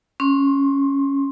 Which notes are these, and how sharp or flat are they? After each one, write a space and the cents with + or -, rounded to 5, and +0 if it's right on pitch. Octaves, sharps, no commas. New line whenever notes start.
C#4 +0 C6 +25